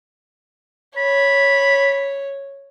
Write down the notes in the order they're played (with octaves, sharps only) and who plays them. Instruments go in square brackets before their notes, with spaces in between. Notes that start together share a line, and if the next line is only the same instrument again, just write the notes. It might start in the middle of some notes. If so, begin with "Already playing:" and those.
[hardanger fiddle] C#5 [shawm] B5